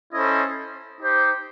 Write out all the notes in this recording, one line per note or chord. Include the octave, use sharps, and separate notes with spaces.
C#4 E4 A4 C5 D#5
D#4 G4 C5